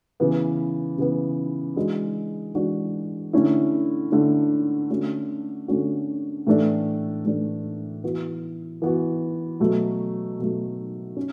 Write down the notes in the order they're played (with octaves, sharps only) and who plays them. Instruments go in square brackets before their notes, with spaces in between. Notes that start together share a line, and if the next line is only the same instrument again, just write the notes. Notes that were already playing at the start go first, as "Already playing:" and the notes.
[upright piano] C#3 E3 B3
C#3 E3 B3
E3 G#3 D4 F#4
E3 G#3 D4 F#4
D3 A3 C#4 E4
D3 A3 C#4 E4
D3 A3 C#4 F#4
D3 A3 C#4 F#4
A2 E3 A3 D4
A2 E3 A3 D4
E3 B3 F#4
E3 B3 F#4
B2 F#3 A3
B2 F#3 A3
C#4